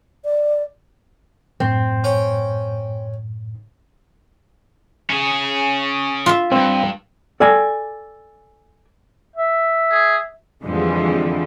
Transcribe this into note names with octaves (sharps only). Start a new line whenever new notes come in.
D5
F#2 A2 C4
C#4 G5 C#6
C#4 G#4
F4 E5
D2 G2 C4
A4 D5 G5 G#5
E5
G#4
F2 D3 E3 F3 G3 G#3